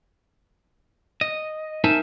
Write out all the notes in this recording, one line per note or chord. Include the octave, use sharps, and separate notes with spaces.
D#5
D#4 A#4 C5 E5 G#5 A5